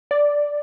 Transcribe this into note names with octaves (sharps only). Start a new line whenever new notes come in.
D5